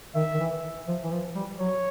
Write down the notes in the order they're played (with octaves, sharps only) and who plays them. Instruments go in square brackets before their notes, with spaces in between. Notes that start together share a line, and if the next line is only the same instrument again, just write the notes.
[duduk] D#3 [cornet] E5
[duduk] D#3
E3
F3
E3
F3
G3
[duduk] F#3 [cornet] C#5